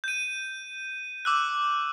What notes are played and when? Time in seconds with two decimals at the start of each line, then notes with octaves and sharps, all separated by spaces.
0.04 G6 D#7
1.25 D6 E6 F#6